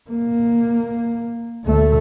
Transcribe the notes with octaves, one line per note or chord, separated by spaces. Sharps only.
A#3
D2 A3